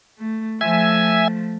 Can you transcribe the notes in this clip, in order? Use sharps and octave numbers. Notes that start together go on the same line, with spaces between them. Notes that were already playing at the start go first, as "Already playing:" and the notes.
A3
F3 A3 E5 G#5